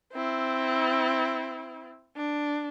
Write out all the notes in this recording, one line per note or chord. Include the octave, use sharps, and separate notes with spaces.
C4 E4
D4